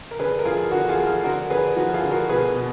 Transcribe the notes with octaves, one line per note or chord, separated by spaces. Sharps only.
A#4
D3 G#4 B4
A#4
F3 F4 G#4
D3 F#4 A#4
F4 G#4
F3
F4 G#4
D3 F#4 A#4
D3 G#4 B4
F3 F#4 A#4
F4 G#4
D3
F#4 A#4
B2 G#4 B4
B2